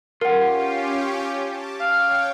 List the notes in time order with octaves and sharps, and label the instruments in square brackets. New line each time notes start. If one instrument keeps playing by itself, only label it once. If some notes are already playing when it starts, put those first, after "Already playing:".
[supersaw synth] C#4 G4 [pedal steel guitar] F4 [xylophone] A#4 F#5
[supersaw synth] A5 D6
[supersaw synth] C#5 G5 [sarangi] F5